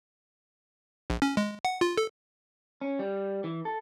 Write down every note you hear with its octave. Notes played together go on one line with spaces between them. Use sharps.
A#1
C#4
G#3
F#5
F4
A4
C#4
G3
E3
A4